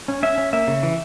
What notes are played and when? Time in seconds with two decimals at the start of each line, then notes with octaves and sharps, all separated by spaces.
0.08 C#4
0.23 C#4 E5
0.38 C#4
0.53 A#3 E5
0.67 C#3
0.83 E3